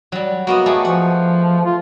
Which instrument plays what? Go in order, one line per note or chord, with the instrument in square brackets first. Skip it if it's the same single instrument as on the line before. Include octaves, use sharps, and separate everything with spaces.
[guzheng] F#3 G3
[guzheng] A#3 B3 D#5 [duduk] F#4
[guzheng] A3 G4 G#4
[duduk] F3 [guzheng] F#5
[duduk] F4